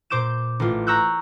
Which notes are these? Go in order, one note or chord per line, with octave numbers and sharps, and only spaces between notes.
A#2 C5 D6 G6 E7
A1 F4
A#5 C#6 E6 F#6 G6